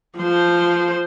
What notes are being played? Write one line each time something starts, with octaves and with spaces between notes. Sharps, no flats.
F3 C5